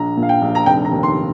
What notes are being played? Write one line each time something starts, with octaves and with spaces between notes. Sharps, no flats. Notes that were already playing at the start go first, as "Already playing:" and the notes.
Already playing: A#1 A#5
A#2
F5
G5
A#1
A#5
F1 G5
A#5
D#2
C6